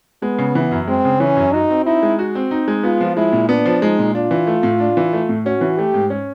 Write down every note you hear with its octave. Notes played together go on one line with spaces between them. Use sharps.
G#3 B3
C#3
E3
F#2
G#3 C4
C#3
E3 C#4
F#2
D#4 F#4
C4
D#4 E4
G#3
F#4
C4
D#4
G#3
B3 F4
F3
G#3 E4
A#2
B3 D4
F3
G#3 D#4
A#2
D4 F4
E3
A3
A2
D4
E3
A3
A2
C#4 F#4
E3
A3 G4
G#2
C#4